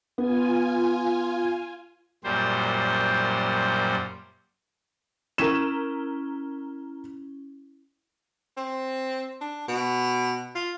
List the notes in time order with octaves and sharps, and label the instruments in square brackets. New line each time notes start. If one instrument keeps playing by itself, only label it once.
[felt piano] B3 [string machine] F4 G#5
[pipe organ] F#2 A#2 G3 C5
[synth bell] C#4 E4 G7 [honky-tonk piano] A#4 E7
[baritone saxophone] C4
D4
B2
F4